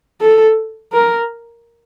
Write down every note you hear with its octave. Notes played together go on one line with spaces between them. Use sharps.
A4
A#4